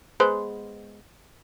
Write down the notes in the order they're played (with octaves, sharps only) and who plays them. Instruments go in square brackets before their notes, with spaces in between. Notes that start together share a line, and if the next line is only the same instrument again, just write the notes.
[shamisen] G#3 B3 C5